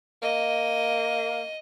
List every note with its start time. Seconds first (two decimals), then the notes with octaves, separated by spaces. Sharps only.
0.22 A#3 D#5